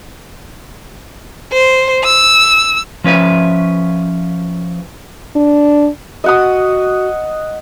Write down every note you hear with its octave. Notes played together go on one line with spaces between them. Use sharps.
C5
E6
F3 C#4 B4 E5
D4
F#4 D#5 F#5 D#6